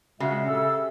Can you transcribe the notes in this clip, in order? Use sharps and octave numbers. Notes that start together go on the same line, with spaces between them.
A#2 C#3 G#3 F#4 E5
G4 A4 E6